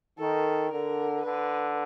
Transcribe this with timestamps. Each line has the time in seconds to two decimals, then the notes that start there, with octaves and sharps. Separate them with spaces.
0.19 D#3 A4
0.71 D3 A#4
1.24 D3 B4